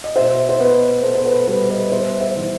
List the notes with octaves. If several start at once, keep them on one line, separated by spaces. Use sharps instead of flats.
D#5
B2 C5 E5
C5
B3 B4 D#5
B3 A4 C5
C5
B4
G3 B4
B4 D#5
B3 C5 E5
C5 E5
E3